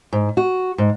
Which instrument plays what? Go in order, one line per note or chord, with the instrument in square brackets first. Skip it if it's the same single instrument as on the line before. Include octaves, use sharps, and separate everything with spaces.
[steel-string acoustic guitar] G#2
F#4
G#2